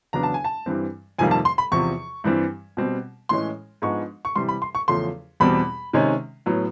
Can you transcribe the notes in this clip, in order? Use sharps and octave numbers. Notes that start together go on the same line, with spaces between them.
E2 C#3 F#3 B3 D4 A#5
A5
G#5
A5
G2 E3 G3 C4
F2 C3 D#3 G3 A#3 G#5
A5
C6
B5
E2 C3 F3 C#6
G2 E3 G3 C4
B2 G3 C4
A2 E3 G#3 C#4 C6
G#2 F3 G#3 B3 D4 C#6
C#6
C3 E3 G3 C6
B5
C6
C#6
E2 C#3 F3 A3 C6
E2 B2 G3 C4 B5
C3 D#3 G#3 C#4
A2 F#3 B3